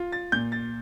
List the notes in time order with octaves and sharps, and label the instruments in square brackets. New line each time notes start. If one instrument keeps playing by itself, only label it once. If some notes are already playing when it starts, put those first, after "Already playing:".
Already playing: [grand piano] F4
A6
A#2 G6
A6